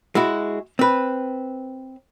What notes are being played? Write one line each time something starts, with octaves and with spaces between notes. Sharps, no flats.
G#3 E4 F#4
C4 B4